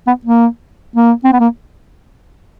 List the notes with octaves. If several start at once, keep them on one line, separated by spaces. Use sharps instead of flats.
B3
A#3
A#3
C4
B3
A#3